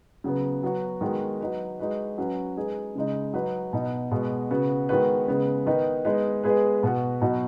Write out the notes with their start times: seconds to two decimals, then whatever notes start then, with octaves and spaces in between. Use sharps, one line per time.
0.24 C#3 F#3 B3
0.63 F#3 B3 F#4
1.01 D#3 G#3 B3 F#4
1.40 F#3 D#4 B4
1.79 G#3 D#4 F#4 B4
2.18 F#3 C#4 F#4 B4
2.57 G#3 D#4 G#4 B4
2.95 C#3 G#3 D#4
3.33 F#3 D#4 B4
3.73 B2 B3 D#4
4.11 B2 G#3 B3 F#4
4.51 C#3 B3 F#4
4.89 D#3 G#3 B3 F#4 B4
5.28 C#3 G#3 B3
5.66 D#3 B3 D#4 B4
6.05 G#3 B3 D#4 B4
6.44 G#3 B3 G#4 B4
6.83 B2 B3 F#4
7.21 B2 F#3 D#4 F#4